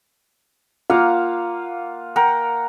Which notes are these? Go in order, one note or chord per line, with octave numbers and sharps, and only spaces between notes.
A#3 F4 F5 F#5
A#4 F#5 G5